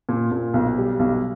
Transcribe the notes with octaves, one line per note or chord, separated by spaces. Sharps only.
A#2
A#2
B1
G3
B1